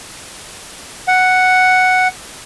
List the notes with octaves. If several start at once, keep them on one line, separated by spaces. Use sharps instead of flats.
F#5